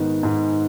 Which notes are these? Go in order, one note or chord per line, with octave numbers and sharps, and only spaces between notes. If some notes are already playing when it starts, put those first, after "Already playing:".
Already playing: G#2 D#3 B3
G#2